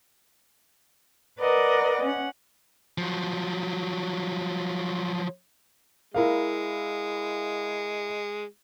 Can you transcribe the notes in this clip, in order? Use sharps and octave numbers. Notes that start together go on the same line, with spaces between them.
A#4 B4 D5 D#5 F#5
C#4 F#5
F3 F#3
G#3 E4 A#4 F5